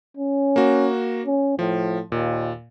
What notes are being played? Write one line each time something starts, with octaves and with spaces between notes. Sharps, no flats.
C#4
A#3 F#4
C#4
A2 F3
D#2 A#2